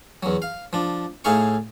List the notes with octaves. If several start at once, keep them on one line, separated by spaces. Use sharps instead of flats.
E2 F#3
F5
F3 D4
A2 D#4 G#4 E5 F5 C#6